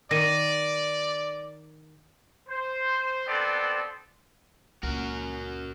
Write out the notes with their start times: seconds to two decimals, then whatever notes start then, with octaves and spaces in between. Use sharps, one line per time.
0.11 D#3 D5 A#6 D#7
2.49 C5
3.27 B3 C4 D4 A4 D5 C6
4.83 C#2 A#2 F#4 A#4